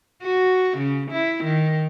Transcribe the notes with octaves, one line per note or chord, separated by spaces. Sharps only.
F#4
C#3
E4
D#3